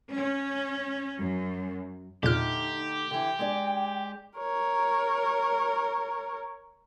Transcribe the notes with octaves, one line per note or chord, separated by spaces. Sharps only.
C#4
F#2
E2 A#2 D3 A3 D#4 G4 F6
D3 E3 G5
G#3 D4 D5
A#4 C#5